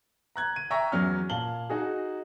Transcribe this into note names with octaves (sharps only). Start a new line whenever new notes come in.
A#5 F#6 G#6
D#7
E5 G5 A#5 C#6 A#6
E2 F#3 C#4 F6
A#2 F5 A5 F#7 G7
D#4 F#4 G#4